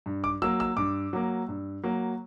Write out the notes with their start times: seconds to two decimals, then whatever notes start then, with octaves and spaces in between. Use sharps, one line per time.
0.06 G2
0.24 D6
0.42 F#3 A#3 E6
0.60 E6
0.77 G2 D6
1.13 F#3 A#3
1.48 G2
1.83 F#3 A#3